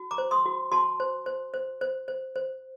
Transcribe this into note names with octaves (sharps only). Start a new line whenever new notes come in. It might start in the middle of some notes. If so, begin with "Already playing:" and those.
Already playing: F#4
A#5 D6
C5
C6 D#6
F#4
F#4 A5 C6
C5
C5
C5
C5
C5
C5